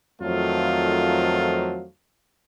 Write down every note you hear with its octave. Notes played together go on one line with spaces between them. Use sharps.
F2 D#3 F3 F#3 A3 F4